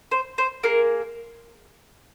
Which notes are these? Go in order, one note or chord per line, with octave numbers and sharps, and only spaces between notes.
C5
C5
A#3 G#4 A#4